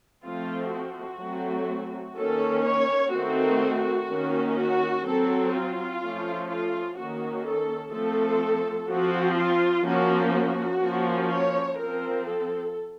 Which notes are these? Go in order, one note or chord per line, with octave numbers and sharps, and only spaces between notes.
F3 A3 C4 F4
F#4
F#3 A3 C4
D#3 A#3 C#4 A4
C#5
D#3 A3 C4 F#4
D#3 A#3 C#4
F#4
F#3 C4 A4
F4
F3 A3 C#4
F4
D#3 A#3 C#4 F#4
A4
F3 A3 C4 A4
F3 C4 F#4
F4
F3 A#3 C#4 F#4
F#4
F3 A#3 C#4
C#5
F3 C4 A#4
A4